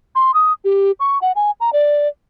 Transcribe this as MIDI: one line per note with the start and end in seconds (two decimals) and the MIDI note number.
0.15 0.34 84
0.34 0.53 87
0.65 0.92 67
1.00 1.18 85
1.22 1.32 78
1.36 1.51 80
1.60 1.73 82
1.73 2.08 74